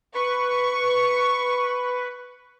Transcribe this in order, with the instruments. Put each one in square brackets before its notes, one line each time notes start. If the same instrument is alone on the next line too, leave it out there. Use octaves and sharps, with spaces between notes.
[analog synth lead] B4 [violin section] C#6